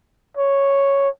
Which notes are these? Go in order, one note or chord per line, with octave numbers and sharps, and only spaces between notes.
C#5